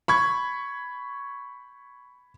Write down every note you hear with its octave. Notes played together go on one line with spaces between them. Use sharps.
B5 C#6 G#6